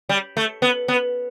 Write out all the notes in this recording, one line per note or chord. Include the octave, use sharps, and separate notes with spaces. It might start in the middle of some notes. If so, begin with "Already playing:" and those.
G3
A3
B3
B3